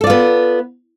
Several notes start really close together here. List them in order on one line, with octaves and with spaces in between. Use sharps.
A4 D5 F4 B3